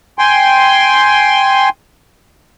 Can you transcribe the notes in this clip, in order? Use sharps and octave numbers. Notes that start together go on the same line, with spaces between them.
G5 G#5 C6